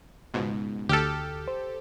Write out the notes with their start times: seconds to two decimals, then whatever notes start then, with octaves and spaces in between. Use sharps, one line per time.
0.34 C#2 G#2 B2
0.89 D2 G4 A4 F6
1.48 C5